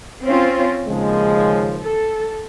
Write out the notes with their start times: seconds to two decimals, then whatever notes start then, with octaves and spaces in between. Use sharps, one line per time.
0.24 C4 C#4 F4
0.87 D#2 C#3 F3 G#3
1.83 A4